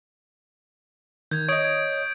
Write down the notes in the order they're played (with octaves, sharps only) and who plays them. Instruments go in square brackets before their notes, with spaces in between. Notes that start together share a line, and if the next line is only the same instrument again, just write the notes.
[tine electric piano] D#3 [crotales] G6 G#6
[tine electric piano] C#5 D#5 [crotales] D#6 G#6 D7
[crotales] G#6 D7